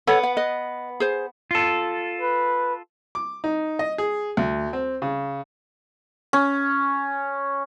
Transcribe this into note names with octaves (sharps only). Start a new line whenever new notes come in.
B3 A4 C#5 F#5
F#5
B4 D#5
G#4 C5
F4 A4
B4
D6
D#4
D#5
G#4
D2
C4
C#3
C#4